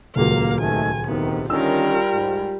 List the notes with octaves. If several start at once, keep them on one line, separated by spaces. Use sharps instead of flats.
D#1 C#2 F#3 A#3 F5
G#1 D#3 A3 G#5
D2 C3 D#3 B3
D3 D#3 G3 C#4 F4 A#4 E6
G#2